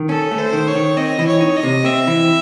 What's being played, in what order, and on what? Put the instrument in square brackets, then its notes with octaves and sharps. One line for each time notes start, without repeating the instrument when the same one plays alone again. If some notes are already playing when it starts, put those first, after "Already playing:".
Already playing: [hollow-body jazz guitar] D#3
[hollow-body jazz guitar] C#4 [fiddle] A4
[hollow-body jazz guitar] A3
[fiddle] C5
[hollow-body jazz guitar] D#3
[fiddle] C#5
[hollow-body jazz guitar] D#3
[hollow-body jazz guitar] C4 [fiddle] D#5
[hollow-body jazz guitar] E3
[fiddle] C#5
[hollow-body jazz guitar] D#4
[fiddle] D#5
[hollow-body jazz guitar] C3
[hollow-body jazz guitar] C4 [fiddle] E5
[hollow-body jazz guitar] E3